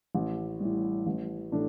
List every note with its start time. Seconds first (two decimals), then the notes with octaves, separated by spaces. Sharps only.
0.15 A1
0.60 A2 E3 G3
1.07 A1
1.52 A2 E3 A3 D4